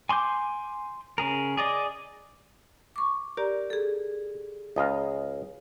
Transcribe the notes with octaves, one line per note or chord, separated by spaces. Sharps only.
G#5 C6 D6 G6
C#3 G#4 A#4
G#4 D5 D#5
C#6 D6
G4 A#4 D5
G#4 A4
C#2 D#5 F5 D#6